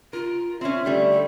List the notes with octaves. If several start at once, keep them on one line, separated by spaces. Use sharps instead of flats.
F4 A#4
C4 C#4 E5
D3 G3 A3
A4